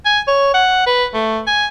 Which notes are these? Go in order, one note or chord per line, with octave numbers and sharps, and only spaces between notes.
G#5
C#5
F#5
B4
A3
G#5